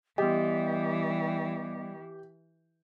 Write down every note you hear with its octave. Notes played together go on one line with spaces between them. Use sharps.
E3 G3 B3 G4 D#5